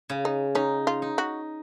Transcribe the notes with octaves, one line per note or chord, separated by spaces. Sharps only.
C#3
D#4
C#4 D#4
F4
D#4
F#4